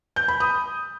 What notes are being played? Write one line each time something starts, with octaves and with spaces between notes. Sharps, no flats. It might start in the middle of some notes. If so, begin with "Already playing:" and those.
G6
B5
D#6